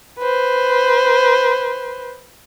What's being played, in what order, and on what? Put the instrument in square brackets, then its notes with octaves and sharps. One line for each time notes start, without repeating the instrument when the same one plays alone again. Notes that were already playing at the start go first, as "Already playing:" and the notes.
[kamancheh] B4 C5